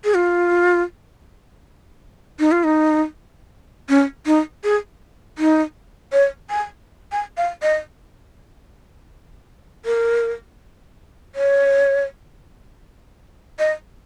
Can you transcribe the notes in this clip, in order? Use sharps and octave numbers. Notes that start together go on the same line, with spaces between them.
G#4
F4
D#4
F4
D#4
C#4
D#4
G#4
D#4
C#5
G#5
G#5
F5
D#5
A#4
C#5
D#5